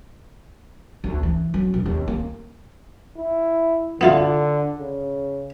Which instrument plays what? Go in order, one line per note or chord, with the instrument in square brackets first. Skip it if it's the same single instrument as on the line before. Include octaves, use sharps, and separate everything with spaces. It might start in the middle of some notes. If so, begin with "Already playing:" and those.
[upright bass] D2
E3
F#3
E1
D#2
A#3
[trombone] E4
[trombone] D3 [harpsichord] B3 E4 F4
[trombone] C#3